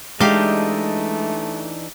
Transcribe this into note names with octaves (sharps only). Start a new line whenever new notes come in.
E3 G#3 A3 D4 D#4 G4 F5